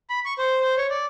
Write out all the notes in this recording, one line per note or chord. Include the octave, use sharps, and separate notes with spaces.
B5
C#6
C5
C5
C#5
D5